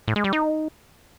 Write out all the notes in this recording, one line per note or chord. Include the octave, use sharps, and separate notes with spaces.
A2
G#3
G3
D#4